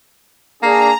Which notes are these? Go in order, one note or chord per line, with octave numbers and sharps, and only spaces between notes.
A#3 D4 G#4 A#5